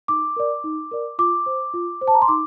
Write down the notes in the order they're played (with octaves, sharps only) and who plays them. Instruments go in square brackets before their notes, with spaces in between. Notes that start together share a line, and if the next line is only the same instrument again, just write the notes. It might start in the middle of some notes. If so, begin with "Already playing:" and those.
[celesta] D#4 D6
A#4 D5
D#4
A#4 D5
F4 D6
C5
F4
C5
A5
A#5
C6
D#4 D6